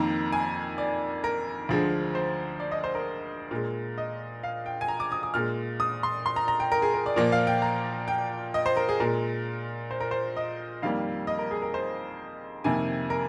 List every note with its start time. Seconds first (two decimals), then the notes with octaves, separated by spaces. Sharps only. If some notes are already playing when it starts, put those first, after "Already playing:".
Already playing: F2 D#3 A#3 A#5
0.32 G#5
0.78 D5
1.24 A#4
1.69 D2 D3 F3 G#3
2.15 C5
2.60 D5
2.72 D#5
2.84 C5
2.95 A#4
3.51 A#2 G#3
3.98 D#5
4.43 F5
4.66 G5
4.81 G#5
4.88 A#5
5.00 D6
5.12 D#6
5.23 D#6
5.34 A#2 G#3 F6
5.80 D#6
6.03 C6
6.26 C6
6.36 A#5
6.48 A#5
6.60 G5
6.72 A#4
6.82 G#4
6.94 A#4
7.06 D5
7.16 A#2 F3 A#3 D5
7.32 F5
7.47 G5
7.62 A#5
8.08 G5
8.54 D#5
8.66 C5
8.77 A#4
8.89 G#4
9.00 A#2 G#3 A#4
9.91 C5
10.00 A#4
10.11 C5
10.37 D#5
10.82 F2 D#3 G3 A#3 F5
11.27 D#5
11.39 A#4
11.51 G#4
11.62 A#4
11.74 C5
12.64 F2 C3 D#3 A#3 G#5
13.10 A#4